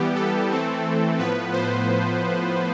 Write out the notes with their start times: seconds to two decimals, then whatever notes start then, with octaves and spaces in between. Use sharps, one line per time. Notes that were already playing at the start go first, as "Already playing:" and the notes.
Already playing: E3 G3 B3 G4
0.15 A4
0.49 E3 A3 C4
1.19 A2 F3 B3 B4
1.52 C5